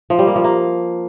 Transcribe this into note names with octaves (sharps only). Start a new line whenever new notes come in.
F3
G3
A#3
F3
A#3